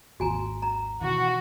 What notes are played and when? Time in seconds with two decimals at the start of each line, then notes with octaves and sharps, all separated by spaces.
0.20 G#1 D#2 F#4 G#5 A#5
0.62 A#5
1.01 B2 D#3 E3 F#4